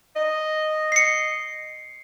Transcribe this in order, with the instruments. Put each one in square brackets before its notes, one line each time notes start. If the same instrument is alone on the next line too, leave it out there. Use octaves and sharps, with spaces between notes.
[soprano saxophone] D#5
[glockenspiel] C7 C#7